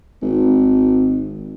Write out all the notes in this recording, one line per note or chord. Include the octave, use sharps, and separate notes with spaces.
G#1